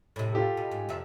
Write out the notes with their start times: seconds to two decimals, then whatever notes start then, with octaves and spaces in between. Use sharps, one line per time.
0.16 A2 C3
0.33 F4 G4 A4
0.57 B2
0.71 G#2
0.89 F2 C3 E5